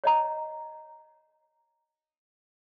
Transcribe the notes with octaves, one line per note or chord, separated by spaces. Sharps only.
C#5 D#5 A#5